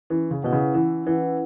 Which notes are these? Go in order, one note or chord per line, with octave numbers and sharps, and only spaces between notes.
E3 C#4
C#3
B2 E4 B4 F#5
C#3
E3 C#4
E3 E4 B4 F#5